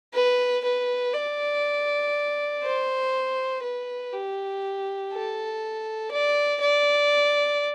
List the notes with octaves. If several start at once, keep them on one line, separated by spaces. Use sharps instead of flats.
B4
B4
D5
C5
B4
G4
A4
D5
D5